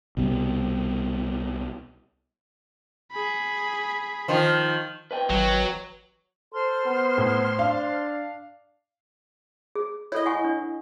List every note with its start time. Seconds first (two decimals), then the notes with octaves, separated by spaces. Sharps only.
0.17 C2 B2 G3 C4
3.12 G#4 B5
4.28 D#3 F3
5.11 B4 D#5 G5
5.30 G#1 F#3
6.54 A4 C5 C6 F6
6.86 B3
7.18 A2
7.59 D4 F5
9.75 G#4
10.12 E4 A4 C#5 D#5
10.26 F#5 G#5 C#6
10.44 D4